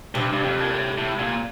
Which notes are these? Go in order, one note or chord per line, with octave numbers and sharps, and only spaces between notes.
G2 C3
G2
F2
A#2
A2
A2
A#2